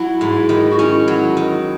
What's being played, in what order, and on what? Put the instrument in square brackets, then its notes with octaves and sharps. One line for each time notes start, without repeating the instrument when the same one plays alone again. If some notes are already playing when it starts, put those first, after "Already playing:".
Already playing: [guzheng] F#3 [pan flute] E4
[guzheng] G#2
D#3
[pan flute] F#4
[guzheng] C#4 [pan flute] E4
[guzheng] F#3
D#3